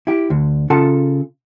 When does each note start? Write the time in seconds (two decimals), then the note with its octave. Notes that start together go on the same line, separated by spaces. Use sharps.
0.07 E4 G4
0.30 D2 D3
0.70 C#3 F4 A4 F#5 A5